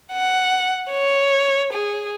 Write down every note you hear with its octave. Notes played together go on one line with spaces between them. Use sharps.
F#5
C#5
G#4